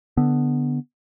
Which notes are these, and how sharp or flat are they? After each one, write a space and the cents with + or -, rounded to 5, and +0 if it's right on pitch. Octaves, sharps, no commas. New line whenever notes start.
D3 +0 B3 +0